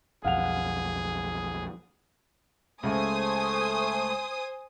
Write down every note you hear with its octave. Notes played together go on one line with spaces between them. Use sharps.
B1 F2 G#4 F5 F#5 F7
C#2 A3 C5 G#5 D#6